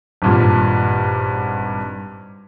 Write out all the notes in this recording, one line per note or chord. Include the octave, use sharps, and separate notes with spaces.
G#1 G2 A#2